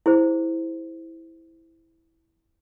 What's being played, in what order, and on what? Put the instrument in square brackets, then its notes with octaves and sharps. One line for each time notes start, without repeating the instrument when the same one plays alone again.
[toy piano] E4 G#4 C5